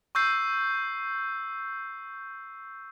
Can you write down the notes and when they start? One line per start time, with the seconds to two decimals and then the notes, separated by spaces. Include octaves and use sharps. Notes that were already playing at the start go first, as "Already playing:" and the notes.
0.15 C#6 E6 G6 C7